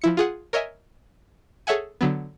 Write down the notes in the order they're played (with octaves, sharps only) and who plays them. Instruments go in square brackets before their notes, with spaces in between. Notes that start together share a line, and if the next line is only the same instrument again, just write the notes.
[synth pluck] F3 E4 C#7
F4 G#4 F#5
A#4 C#5 D#5 E5 G#5
G#4 A4 C#5 E5 F#5 G#5
D3 F#3 B3